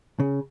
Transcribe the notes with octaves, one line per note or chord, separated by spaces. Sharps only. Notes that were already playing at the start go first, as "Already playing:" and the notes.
C#3